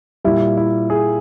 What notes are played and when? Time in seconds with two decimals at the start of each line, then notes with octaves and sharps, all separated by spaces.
0.24 A#2 G3 E4
0.57 E4
0.90 G#4